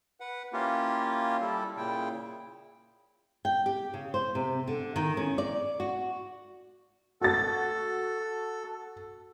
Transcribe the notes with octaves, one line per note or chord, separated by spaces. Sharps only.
B4 F#5
A#3 C#4 E4 F4 G4 A#4
G3 E4 A4
A#2 C#3 E4 G5
G5
G4
C#3
C5
C3
D3
D#3
C#4
D5
F#4
F#4 A4 A6